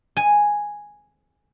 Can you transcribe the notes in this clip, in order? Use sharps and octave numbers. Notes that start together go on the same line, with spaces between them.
G#5